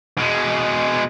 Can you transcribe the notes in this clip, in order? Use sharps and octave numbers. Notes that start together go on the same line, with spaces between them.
B2 G#3